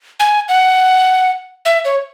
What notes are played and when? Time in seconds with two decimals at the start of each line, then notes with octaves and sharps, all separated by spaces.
0.20 G#5
0.49 F#5
1.65 E5
1.85 C#5